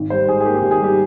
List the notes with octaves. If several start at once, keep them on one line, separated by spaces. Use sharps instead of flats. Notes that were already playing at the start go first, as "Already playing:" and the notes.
Already playing: G#1
G3 C5
G#2 G#4
G#4
A#3 G4
G4
G#1
G#4
G3 G4